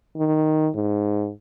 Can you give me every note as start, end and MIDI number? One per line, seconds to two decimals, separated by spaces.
0.17 0.69 51
0.75 1.30 44